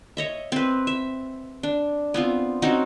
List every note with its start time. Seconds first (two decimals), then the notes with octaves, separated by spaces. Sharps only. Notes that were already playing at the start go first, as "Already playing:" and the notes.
0.17 C#5 D#5 E5
0.52 C4 B4
0.87 E5
1.63 D4
2.14 B3 C4 F4
2.62 C4 C#4 D#4 F#4